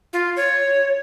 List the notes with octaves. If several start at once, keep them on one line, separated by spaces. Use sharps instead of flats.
F4
C#5